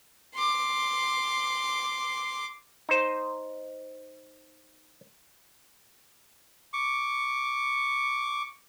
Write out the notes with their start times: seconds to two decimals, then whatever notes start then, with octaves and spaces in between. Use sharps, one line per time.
0.35 C6 D6
2.89 D#4 C5
6.73 C#6 D6